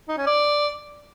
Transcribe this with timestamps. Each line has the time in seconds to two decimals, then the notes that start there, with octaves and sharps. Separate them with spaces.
0.09 D#4
0.17 C#4
0.26 D5